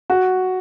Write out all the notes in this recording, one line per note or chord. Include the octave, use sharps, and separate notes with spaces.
F#4